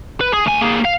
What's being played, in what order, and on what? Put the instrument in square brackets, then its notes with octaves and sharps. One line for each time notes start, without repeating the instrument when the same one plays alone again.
[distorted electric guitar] B4
G#4
D2 G#5
A#3 G#4
F5